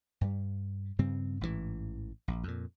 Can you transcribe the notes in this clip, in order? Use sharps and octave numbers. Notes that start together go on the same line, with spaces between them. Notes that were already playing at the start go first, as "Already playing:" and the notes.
G2 G3
G2 C#3 G3 C4
A1 G#2 C3 E3
A#1
F2 A#2